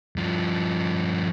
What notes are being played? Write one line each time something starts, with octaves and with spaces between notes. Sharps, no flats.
G2 F3